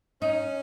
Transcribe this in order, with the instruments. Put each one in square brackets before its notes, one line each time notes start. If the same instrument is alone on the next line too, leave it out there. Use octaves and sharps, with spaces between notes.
[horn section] C#4 [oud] D#4